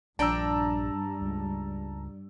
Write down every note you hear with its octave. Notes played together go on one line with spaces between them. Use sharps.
A#1 G2 G3 D4 G5 A5 A#5 E6
C#2